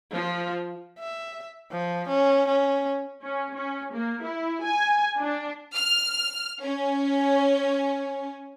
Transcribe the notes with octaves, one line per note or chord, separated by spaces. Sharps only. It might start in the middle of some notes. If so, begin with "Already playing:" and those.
F3
E5
F3
C#4
C#4
C#4
C#4
A#3
E4
G#5
D4
F6
C#4